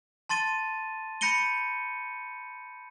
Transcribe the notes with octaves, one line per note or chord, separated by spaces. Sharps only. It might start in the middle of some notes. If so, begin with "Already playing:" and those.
A5 C6 A6 D#7 G7
B5 G6 A#6 C#7 D#7 G7